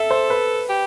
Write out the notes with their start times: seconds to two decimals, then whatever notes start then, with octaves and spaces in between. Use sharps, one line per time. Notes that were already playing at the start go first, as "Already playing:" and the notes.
Already playing: A4 E5
0.11 C5
0.30 B4
0.69 G4